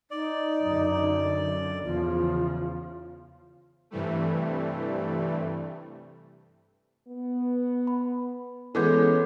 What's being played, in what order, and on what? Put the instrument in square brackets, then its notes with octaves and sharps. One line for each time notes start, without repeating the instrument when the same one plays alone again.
[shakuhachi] D#4 [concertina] D5
[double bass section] F#2 D3
[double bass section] E2 C#3 F3 [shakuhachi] F4
[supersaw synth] G2 C3 E3 G3 A3
[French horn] B3
[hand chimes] B5
[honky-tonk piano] E3 G#3 B3 [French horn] C#4 [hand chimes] A4 D6 G6